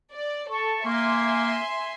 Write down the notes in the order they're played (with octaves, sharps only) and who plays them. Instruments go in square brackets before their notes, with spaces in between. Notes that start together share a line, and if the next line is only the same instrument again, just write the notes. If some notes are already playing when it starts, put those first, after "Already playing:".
[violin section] D5
[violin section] A4 [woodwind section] A5 C#6
[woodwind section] A#3 [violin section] E5 G#5 C6